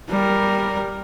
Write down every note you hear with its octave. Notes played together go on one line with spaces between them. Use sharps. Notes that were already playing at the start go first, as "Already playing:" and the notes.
G3 A#4